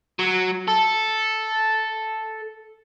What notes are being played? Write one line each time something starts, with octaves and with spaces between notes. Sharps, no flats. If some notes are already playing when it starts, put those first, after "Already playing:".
F#3
A4